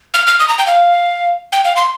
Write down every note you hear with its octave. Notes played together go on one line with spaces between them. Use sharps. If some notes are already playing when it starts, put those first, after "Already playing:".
F6
F6
D#6
A#5
G5
F5
G5
F5
C6